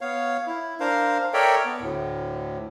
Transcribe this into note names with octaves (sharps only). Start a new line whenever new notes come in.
B3 C#5 F5
E4
D4 A#4 C5 F5
A4 A#4 C#5 D5 E5 G5
B3
D2 A2